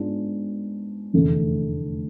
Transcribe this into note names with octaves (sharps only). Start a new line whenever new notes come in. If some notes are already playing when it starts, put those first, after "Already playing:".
Already playing: G#2 G#3 B3 D4 F4
F1 E2 D3 A3